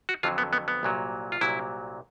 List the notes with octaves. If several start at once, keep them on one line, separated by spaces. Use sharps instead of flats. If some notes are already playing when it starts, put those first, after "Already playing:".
F#4
F2 D3 F#3 F4
B3
B3
B3
C2 A#2 F#3
F4
C2 A#2 F#3 E4